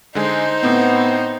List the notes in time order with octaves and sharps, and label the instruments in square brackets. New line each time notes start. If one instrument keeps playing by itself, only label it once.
[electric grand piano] D3 G#3 G#5 [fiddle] D#4 C5
[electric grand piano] A2 C4 [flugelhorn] B3